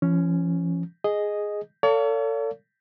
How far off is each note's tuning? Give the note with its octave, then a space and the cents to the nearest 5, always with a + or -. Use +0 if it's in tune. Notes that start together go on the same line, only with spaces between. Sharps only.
F3 -45 C#4 +0
G#4 +0 D#5 +0
A4 +35 C#5 +45 F5 +0